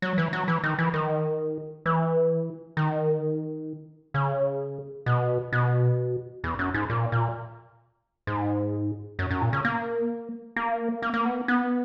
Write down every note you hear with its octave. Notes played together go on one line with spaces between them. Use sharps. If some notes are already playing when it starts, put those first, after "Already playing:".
F#3
E3
F#3
E3
D#3
E3
D#3
E3
D#3
C#3
B2
B2
E2
F#2
G#2
A#2
A#2
G#2
F#2
F#2
A#2
C#3
A#3
A#3
A#3
A#3
B3
B3